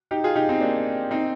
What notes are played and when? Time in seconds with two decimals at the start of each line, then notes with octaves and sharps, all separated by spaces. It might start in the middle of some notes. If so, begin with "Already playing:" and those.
0.11 D#4 G4
0.24 F4 G#4
0.36 D#4 G4
0.49 C4 D#4
0.61 A#3 D4
1.11 C4 D#4